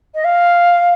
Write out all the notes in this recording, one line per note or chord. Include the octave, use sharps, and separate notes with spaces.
D#5
F5